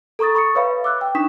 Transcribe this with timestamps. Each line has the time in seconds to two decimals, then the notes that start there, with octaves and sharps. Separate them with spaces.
0.19 A4 A#5 C#6 D#6 A6
0.35 B5 C#6 D#6 A6 C#7
0.55 B4 C#5 E5 F5 B5
0.84 D6 E6 F#6
1.01 G5
1.15 D4 D#4 C#6 D#6 B6 E7